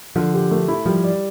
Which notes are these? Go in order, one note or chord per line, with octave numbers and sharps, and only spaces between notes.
D3 F3
G4
A3
E4
F3 G3
D5